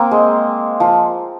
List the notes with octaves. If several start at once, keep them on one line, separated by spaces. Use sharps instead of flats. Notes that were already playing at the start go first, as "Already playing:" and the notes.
Already playing: A#3 C4
G#3
F3